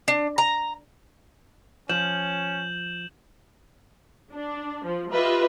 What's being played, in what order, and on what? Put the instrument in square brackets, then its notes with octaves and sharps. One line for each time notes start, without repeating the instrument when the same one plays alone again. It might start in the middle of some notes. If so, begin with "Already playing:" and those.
[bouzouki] D4
A#5
[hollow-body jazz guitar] F3 [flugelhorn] C#4 [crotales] G6 E7 F#7
[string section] D4
F3
F4 G4 B4 D#5 E5